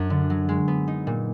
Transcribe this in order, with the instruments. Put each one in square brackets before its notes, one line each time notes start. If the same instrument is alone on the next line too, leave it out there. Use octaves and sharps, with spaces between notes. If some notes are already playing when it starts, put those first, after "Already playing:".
Already playing: [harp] F#2 F#3 D4
D3
F#3
G#3
B3
D#4
A#2